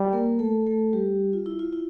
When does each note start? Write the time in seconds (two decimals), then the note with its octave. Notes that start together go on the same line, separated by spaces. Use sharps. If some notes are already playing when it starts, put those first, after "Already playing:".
Already playing: G3
0.13 A#3 A#4
0.39 A3 A4
0.67 A3 A4
0.93 G3 G4
1.33 F4
1.46 E4
1.59 F4
1.73 E4